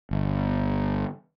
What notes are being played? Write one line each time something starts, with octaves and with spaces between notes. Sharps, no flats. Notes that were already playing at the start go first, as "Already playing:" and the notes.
G1